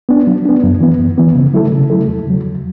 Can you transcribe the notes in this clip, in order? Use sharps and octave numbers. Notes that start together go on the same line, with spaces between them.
B3 D4
F#3
B3 D4
F#2
E3 B3
F#2
E3 B3
C#3
F#3 A3 E4 A4
C#3
F#3 A3 E4 A4
E2
C#3 F#3
E2